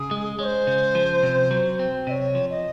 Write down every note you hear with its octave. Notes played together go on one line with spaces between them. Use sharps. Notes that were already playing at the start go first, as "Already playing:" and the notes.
Already playing: C#3 G#4
G#3
G#3 C5 C#5
C#3
F3
C3
F#3
C4
C3 C#5 D#5
F3
D#5